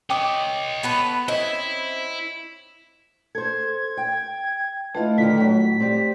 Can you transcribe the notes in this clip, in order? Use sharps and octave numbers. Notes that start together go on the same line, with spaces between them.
C#5 D#5 G5 D6 D#6
B3 A4 B4
C4 C#4 E4 D#5
A4 C5 G#6
G5
A3 E4 F4 B4 D#5
D3 D#3 F4 B6
A2 F#3
G3 C4